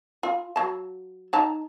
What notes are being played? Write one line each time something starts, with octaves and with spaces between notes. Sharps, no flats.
F4
F#3 A5
D#4 A5 A#5